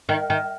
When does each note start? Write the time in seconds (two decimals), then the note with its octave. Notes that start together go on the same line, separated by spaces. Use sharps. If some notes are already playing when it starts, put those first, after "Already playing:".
0.09 D#3
0.30 D#3